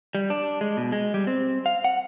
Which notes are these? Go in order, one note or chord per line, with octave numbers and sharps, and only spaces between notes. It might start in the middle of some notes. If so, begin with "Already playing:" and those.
G3
D4
G#3
B2
G#3
G3
C4
F5
F#5